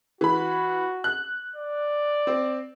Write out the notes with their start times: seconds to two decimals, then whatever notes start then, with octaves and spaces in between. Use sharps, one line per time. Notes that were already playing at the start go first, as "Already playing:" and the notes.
0.21 E3 F#4 B5
1.04 F#6
1.56 D5
2.27 C4